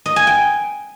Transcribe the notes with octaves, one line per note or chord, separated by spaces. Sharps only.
D#5
G#5
G5